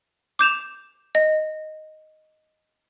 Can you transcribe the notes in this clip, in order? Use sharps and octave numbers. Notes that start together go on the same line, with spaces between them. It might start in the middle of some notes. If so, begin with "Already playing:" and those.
D6 G6 E7 F7
D#5